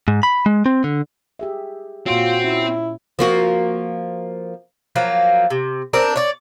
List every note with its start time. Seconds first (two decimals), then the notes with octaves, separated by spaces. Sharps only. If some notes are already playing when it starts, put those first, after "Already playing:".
0.08 G#2
0.23 B5
0.46 G#3
0.66 C4
0.84 D3
1.39 G4 G#4 E5
2.06 A#2 C4 F4 F#4 C#5
2.44 C#4 E4
3.19 F3 A#3 F#4
4.96 F3 F#3 A#3
5.50 C3
5.93 C4 D4 A#4
6.16 C#5 D5